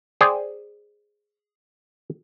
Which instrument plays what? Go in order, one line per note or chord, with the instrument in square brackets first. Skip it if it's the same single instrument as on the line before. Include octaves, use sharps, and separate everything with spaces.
[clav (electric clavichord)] G#4 C5 D5 G5 G#5